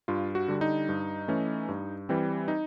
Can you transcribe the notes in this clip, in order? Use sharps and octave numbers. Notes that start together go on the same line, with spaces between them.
G2 F4
F#4
D3 G3
D#4
G2
E3 A3 C#4
G2
E3 G3 C4
D#4